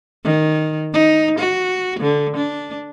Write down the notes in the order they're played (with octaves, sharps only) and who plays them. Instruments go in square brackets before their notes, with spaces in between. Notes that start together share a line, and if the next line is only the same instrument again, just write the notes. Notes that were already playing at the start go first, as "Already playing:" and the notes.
[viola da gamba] D#3
D#4
F#4
D3
D4